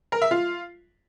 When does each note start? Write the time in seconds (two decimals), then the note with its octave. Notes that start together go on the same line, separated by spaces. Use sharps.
0.12 A#4
0.22 E5
0.31 F4